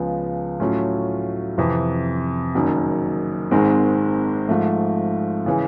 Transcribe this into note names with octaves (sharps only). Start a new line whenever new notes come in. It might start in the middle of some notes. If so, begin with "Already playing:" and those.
Already playing: C#2 C#3 F3 G#3 B3
A2 F#3 A3 C#4 F4
F2 C3 E3
F#1 F#2 D#3
G#1 G#2 D#3 G#3 C4
G#2 F3 A3
C#3 E3 G#3